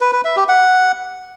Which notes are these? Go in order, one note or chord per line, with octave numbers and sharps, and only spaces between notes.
B4
B4
E5
G4
F#5